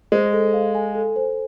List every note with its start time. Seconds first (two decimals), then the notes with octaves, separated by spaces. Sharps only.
0.12 G#3 C5
0.33 A4
0.53 F5
0.75 G#5
0.95 A4
1.16 C5